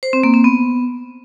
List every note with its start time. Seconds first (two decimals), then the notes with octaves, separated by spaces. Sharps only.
0.03 C5
0.13 C4
0.23 A#3
0.34 C4
0.44 B3